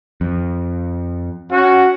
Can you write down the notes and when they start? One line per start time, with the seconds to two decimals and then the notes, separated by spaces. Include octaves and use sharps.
0.21 F2
1.52 C#4 F#4